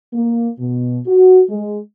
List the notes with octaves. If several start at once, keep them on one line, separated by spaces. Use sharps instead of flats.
A#3
B2
F#4
G#3